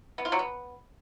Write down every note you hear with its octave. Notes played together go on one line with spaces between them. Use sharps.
B3
F4
F#3
B3